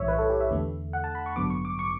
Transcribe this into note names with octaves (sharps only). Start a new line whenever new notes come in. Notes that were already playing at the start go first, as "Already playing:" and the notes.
Already playing: B1 A2 E3 G3 C#5 E5
B4
A4
G4
E5
E2 D3 A3
F#5
A5
B5
C#6
A1 G2 D3 F#3 B3 D6
C#6
D6
C#6